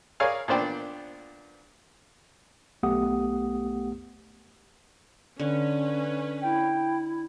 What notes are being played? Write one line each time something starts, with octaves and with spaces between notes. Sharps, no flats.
G#4 A#4 C#5 D5 F5 G#5
A#2 B3 D4 C5 D5 G5
B1 A3 B3 G4 F#5 D#6
D3 C#4 B4
E4 G5